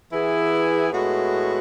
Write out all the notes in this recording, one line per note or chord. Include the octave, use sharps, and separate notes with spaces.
E3 B3 E4 G#4
A2 G#3 B3 F#4